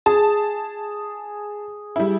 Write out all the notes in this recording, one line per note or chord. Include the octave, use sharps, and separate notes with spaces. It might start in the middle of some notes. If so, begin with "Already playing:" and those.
G#4 A5
G3 E4